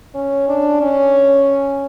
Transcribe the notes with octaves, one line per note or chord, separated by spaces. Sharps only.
C#4
D4
C#4